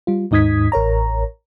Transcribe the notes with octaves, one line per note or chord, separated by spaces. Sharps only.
G3 F4
D#2 G#2 D#4 D#6 G#6 B6
A1 A#4 C#5 A#5